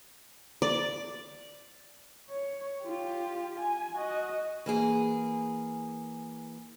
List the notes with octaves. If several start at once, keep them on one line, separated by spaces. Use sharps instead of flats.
D5
C#5
F4 G4
G#5
F#4 D#5
E3 A#3 G#4